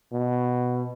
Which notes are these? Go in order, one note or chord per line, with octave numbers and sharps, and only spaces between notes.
B2